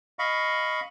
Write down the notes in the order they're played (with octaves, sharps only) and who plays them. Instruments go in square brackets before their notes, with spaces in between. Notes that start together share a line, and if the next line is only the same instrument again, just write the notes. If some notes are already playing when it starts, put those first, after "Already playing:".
[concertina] D#5 F5 B5 C#6